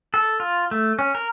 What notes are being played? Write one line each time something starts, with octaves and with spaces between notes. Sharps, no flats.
A4
F4
A3
C#4
A#4